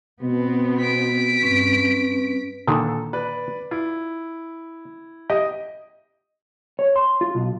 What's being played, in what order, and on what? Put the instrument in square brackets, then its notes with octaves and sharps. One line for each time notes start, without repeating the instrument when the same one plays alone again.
[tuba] B2 [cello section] B3 C4
[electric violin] B6 D7
[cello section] G2 [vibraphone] C4 C#4 B4
[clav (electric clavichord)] A#2 D3 D#3 [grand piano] A4
[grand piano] B4 D5
[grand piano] E4 [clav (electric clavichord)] F4
[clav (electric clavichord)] G4 [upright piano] D#5
[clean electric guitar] C#5
C6
F4
B1